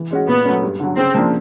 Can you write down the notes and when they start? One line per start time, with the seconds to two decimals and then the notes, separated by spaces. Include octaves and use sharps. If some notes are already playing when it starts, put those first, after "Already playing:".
Already playing: E3
0.11 G#3 C#4 F#4
0.28 A#2 B3
0.45 F#3 A3 C#4
0.62 G2
0.80 D3 F#3
0.97 C#3 C4
1.14 F3 A#3 D4